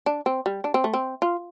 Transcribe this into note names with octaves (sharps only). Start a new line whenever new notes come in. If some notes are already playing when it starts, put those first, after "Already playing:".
D4
C4
G3
D4
C4
A3
C4
F4